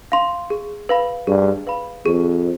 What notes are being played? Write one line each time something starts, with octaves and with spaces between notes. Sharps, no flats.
F5 C6
G#4
B4 F5 B5
G2 G#4
B4 F5 B5
F2 G#4